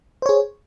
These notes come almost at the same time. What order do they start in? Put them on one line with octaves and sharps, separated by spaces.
C5 C#5 G#4